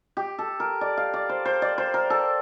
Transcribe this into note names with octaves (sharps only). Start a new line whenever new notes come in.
G4
A4
A#4
D5
F5
D5
C5
C5
D5
C5
A#4
A4